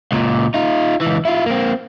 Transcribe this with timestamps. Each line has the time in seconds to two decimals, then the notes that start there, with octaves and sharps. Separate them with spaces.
0.12 C#2 A#2
0.54 D#4 F4
1.01 C#2 E3
1.25 E4 F4
1.46 A#3 C4